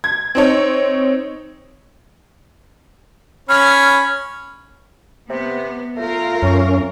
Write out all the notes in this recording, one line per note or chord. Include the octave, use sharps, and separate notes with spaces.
G#6
C4 D#4 C#5
C#4 C#5 B5 F6
C3 B3
A3 F4 A#4
F#2 C#4